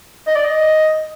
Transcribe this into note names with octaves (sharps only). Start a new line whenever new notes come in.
D#5
D5
D#5